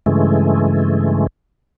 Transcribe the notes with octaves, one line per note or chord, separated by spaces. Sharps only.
G2 C#3 E3 G#3 A3